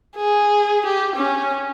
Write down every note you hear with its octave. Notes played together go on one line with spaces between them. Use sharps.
G#4
G4
C#4